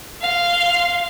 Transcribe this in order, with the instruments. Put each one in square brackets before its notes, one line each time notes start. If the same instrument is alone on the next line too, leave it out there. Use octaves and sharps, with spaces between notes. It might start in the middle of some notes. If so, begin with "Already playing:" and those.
[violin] F5 C6